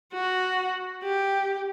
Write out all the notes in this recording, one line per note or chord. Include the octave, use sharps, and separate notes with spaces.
F#4
G4